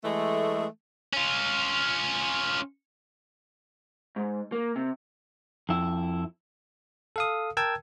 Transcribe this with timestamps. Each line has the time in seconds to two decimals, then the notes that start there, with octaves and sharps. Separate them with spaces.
0.03 E3 G#3 A3
1.13 C#4 F4
4.16 G#2
4.52 A#3
4.76 C3
5.69 F2 E4
7.16 A4 F5 D#6
7.57 A#4 G5 A5 E6 G#6